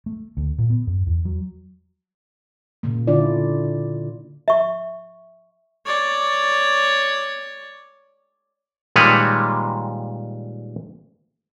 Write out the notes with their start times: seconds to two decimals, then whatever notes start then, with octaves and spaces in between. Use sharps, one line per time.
0.06 A3
0.37 D2
0.59 A#2
0.70 B3
0.87 F#2
1.07 E2
1.25 F#3
2.83 A#2 C#3 A#3
3.07 D3 D4 E4 F4 D5
4.48 E5 C#6
5.86 C#5 D5
8.96 A#2 D#3 G3 G#3 B4 C#5